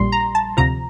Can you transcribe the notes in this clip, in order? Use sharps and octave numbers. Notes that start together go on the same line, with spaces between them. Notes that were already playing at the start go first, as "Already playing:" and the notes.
Already playing: A#1 A#2 G3 C6
A#5
A5
D2 C3 F3 A#5